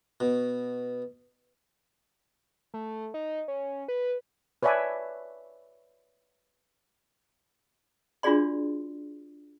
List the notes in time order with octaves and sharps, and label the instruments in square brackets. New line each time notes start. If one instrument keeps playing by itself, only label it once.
[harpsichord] B2
[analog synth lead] A3
D#4
C#4
B4
[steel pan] B4 C#5 D5 E5 G#5 A5
[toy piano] D4 F4 F#4 G#4 D5 C6